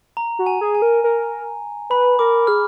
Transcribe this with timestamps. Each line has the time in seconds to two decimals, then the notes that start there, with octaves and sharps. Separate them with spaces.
0.17 A#5
0.39 F#4
0.46 G#5
0.61 G#4
0.75 G#5
0.82 A#4
1.04 A#4
1.90 B4 B5
2.19 A#4 D6
2.47 G#4 F6